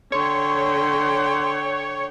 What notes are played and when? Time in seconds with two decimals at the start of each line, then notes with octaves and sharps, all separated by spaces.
0.12 D3 C#5 G5 C6